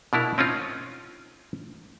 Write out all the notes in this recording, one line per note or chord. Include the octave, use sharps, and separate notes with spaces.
B2 D4 E4 A#4
C4 C#4 D#4 F4